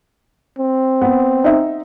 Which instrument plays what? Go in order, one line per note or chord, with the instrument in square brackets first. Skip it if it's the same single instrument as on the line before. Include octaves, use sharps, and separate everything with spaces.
[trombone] C4
[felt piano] B3
D#4 E5